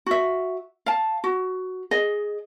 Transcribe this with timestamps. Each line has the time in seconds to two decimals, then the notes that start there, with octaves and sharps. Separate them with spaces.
0.06 F#4 E5
0.86 F5 A5
1.24 F#4
1.91 G#4 D#5